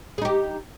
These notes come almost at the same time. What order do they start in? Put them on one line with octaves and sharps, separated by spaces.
G#4 D#4 G4